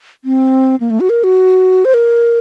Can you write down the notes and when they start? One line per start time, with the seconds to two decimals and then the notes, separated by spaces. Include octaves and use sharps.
0.25 C4
0.80 A#3
0.90 A3
1.00 F#4
1.10 A#4
1.24 F#4
1.85 C5
1.94 A#4